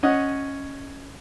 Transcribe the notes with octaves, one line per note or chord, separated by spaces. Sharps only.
C#4 D#5 F#5